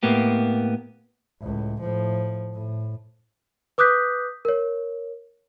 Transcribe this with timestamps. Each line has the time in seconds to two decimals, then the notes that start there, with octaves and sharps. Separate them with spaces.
0.03 A2 A#3 B3 G4
1.42 C#2 A2
1.80 A2 F3
2.54 A2
3.78 B4 D6 D#6 F#6 G6 B6
4.45 A#4 C#5